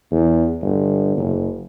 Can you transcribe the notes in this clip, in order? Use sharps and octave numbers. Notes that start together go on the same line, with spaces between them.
E2
G1
F#1